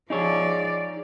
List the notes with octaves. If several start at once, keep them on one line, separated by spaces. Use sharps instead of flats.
F3 D#4 G#4 C#5 D5